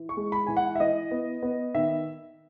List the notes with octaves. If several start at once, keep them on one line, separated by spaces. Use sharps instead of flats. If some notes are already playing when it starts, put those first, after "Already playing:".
Already playing: E3
C#6
G#3
B5
E3 G#5
F#5
E5
E3 D#5
B3
B3
D#3 E5